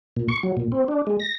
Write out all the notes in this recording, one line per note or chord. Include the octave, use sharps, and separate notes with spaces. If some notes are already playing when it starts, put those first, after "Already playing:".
A#2
C#6
F#3
A#2
C4
D4
G#3
A#6